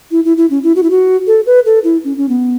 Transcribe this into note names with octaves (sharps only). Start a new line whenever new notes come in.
E4
E4
E4
C#4
E4
F#4
E4
F#4
A4
B4
A4
E4
C#4
C#4
B3